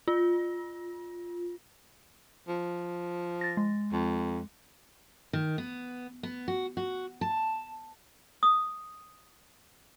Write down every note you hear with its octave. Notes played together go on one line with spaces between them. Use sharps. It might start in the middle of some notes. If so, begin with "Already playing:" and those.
F4
F3
A6 A#6
G#3
F2
D#3
B3
B3
F#4
F#4
A5
D#6